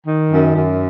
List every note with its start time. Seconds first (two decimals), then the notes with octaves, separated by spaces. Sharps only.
0.07 D#3
0.31 F#2
0.55 F#2